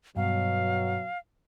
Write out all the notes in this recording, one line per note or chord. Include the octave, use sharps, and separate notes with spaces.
G2 B2 F#3 F5